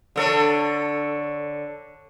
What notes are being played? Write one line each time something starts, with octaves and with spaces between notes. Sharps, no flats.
D3 A4 C#5